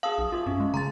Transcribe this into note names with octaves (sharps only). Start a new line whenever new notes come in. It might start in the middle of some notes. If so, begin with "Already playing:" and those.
F#4 G#4 F5 A5 D#6 E6
B1
F4 G4 C#5 E5
G2 C#4
G#3
C#3 G#5 A#5 C6 A6